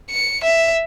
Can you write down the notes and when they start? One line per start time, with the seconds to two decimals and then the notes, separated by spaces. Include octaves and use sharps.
0.10 C#7
0.44 E5